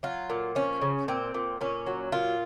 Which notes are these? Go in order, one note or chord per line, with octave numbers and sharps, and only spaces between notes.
F#3 F4
A#2
F3 C#4
C#3
A#2 C4
A#2
A#2 C#4
F#3
A#2 F4